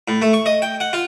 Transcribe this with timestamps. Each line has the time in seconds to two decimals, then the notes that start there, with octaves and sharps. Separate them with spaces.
0.08 A2
0.22 A3
0.33 C#6
0.46 D#5
0.62 G5
0.80 F#5
0.93 F4